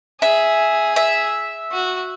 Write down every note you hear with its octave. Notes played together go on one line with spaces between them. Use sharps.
G#4 E5
E5
F#4